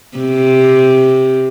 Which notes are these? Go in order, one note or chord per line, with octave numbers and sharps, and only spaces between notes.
C3